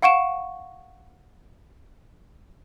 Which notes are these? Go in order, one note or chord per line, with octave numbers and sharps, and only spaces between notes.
F5 F#5 C#6 D7 E7